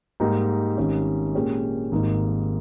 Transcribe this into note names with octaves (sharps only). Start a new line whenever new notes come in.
G#2 G3 A#3 D#4 G4
G#1 G#2 G3 C#4
A#2 G#3 C#4 G4
G#1 G#2 G3 A#3 D#4